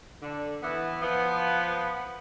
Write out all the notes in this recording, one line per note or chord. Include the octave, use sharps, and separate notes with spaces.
D3
E3 B3
F3 B3